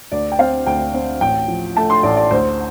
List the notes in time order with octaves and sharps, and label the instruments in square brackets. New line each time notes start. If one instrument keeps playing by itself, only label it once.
[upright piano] D2 D5
G5
C4 F5
D2 G5
C4
A1 G5
F3
A3 A5
C6
A1 D5
D5
D2 C5